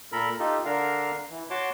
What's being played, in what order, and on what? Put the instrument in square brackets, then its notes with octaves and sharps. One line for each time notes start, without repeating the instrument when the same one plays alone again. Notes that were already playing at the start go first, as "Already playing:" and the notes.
[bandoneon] A#2 A4 A#4 B5
D#4 F4 G4 A4
D3 D4 A#4 F5
E3
F#4 C#5 A5 C6 D6